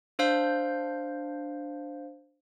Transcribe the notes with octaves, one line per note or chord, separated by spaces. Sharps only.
D4 C5 F5 G6